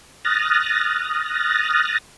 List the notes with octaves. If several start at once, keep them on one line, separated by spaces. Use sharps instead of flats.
D#6 F6 F#6 A6 A#6